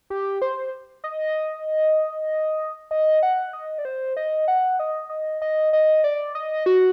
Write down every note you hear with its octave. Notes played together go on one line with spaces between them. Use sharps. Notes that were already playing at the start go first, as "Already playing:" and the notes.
G4
C5
D#5
D#5
F#5
D#5
D5
C5
D#5
F#5
D#5
D#5
D#5
D#5
D5
D#5
F#4